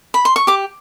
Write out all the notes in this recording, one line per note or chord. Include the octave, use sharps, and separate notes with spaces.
B5
C6
C#6
G4 D6